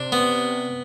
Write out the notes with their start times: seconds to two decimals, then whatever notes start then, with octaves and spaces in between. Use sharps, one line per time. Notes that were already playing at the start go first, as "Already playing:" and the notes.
Already playing: C3 D4
0.12 B3